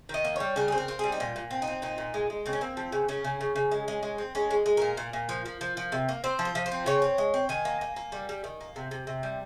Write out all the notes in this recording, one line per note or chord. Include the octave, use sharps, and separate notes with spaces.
D#3 D#5
A#3
G3 C#5
C#3 A#4
C4 G#4
A#4
C4
G3 G#4
D#4
A#2 F4
A#2
C4
D#4
C4
A#2 D#4
A#2
G#3
G#3
C#3 C4
C#4
A#3 C4
F3
C#3
C#3 C#4
C#3
C#3
C#3
G#3
G#3
G#3
C4
G#3 C#4
G#3
G#3
A#2 A#4
A#2
A#2
F3
F3
F3
F3
C3
A#3
C4 C5
F3
C5
F3
C5
C4
C#3 C#5
C4
G#3
C4
D#3 G#5
A#3
A#3
A#3
G3
G3
D#3
A#3
C3
C3
C3
G3